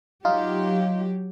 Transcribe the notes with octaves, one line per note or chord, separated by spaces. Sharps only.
F#3 D#4 F4 G4